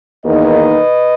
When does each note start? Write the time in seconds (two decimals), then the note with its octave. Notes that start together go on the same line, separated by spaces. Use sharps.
0.24 E2 D#3 A#3 D#4 B4 D#5